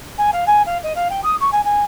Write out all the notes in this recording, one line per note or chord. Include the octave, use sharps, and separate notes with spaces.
G#5
F5
G#5
F5
D#5
F5
G5
D#6
C#6
G#5
G#5